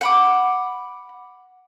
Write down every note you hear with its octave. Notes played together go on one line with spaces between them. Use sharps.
F#5 B5 D6